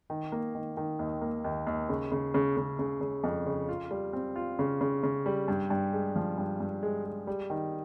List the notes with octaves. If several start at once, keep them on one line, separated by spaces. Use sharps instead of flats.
D#3
A#3
D#3
D#3
D#2
A#3
D#2
D#2
C#3
C#3
C#3
C#3
C#3
C#3
F2
C#3
F4
G3
C4
F4
C#3
C#3
C#3
G3
G2
G2
G#3
F3
G2
G2
G#3
G#3
G3
D#3